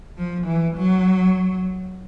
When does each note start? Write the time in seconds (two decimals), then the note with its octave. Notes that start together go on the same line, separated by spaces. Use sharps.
0.17 F3
0.47 E3
0.75 F#3